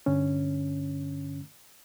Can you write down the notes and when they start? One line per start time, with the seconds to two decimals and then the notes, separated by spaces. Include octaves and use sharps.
0.06 G2 D3 C#4